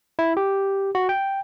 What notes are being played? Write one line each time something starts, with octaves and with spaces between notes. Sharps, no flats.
E4
G4
F#4
G5